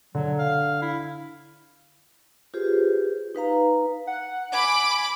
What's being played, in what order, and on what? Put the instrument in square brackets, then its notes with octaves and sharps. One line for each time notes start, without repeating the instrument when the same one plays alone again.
[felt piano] D3 [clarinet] F#3
[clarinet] F5
E4
[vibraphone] F4 G4 G#4 B4 C5
D#4 B4 F5 A#5
[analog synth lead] F#5
[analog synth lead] G#5 [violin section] B5 D6